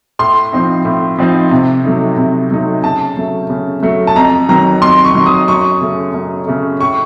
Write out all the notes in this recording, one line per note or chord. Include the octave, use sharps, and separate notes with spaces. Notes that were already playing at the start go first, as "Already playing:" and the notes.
A2 C6
F3 C4 D#4
A2
F3 C4 D#4
C3
F#3 A3 D#4
C3
F#3 A3 D#4
C#3 A5
F#3 A3
C#3
F#3 A3
A5
F2 A#5
D#3 F#3 A#5
F2 C6
C#6
D#3 F#3
D#6
F#2 C#6
C#3 A3
F#2
C#3 A3
A2 C#6